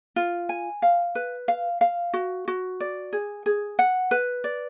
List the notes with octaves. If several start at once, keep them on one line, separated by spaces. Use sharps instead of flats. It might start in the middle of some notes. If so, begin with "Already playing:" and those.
F4
G#5
F5
B4
F5
F5
F#4
F#4
D5
G#4
G#4
F#5
B4
D5